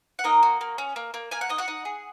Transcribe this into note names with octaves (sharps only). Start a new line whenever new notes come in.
F#5
A#3 D#4 D#5
F#4
A#3
C#4
A#3
A#3
A#3 G#5
F#5
D#4 D#5
F#4 F#5
D#4
G#4